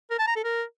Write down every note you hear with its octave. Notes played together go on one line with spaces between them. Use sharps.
A#4
A5
A#5
A4
A#4